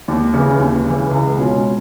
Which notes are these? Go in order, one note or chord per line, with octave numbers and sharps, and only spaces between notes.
D#2
C#3 E3
D#2
C#3 E3
C#2
B2 G#3 C#4 F4